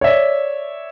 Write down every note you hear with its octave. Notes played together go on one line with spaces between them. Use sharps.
C#5 D5 E5